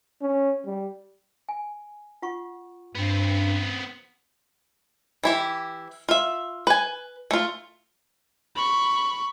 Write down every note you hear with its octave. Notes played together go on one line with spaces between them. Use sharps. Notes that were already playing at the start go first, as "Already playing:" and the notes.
C#4
G3
G#5
F4 F#5 C#6
G2 B3 C4
E3 E4 G4
F4 E5
B4 G#5
A3 F4
B5 C#6